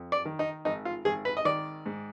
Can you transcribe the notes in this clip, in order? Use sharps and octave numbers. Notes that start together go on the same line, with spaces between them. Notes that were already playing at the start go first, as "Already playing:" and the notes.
Already playing: F2
D5
D#3
D#4
G#1 D#4
F4
G#1 G#4
B4
D#5
D#3 D5
G#2